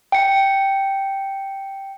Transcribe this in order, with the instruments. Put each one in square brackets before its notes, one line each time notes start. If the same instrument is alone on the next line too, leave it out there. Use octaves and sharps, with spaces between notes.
[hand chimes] G5 C#7